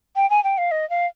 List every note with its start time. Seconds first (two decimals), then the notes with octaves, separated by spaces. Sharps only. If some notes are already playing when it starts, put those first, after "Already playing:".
0.16 G5
0.30 G#5
0.44 G5
0.58 F5
0.71 D#5
0.90 F5